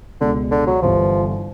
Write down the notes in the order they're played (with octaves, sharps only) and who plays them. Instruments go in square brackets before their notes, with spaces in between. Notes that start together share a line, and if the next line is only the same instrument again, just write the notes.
[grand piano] C#2 B2 G#3 [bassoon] D3
[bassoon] D3
F#3
[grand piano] G1 G2 E3 [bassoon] F3